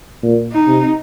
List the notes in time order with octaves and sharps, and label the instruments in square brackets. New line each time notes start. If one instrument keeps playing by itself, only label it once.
[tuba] A#2
[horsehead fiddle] D#4
[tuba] C3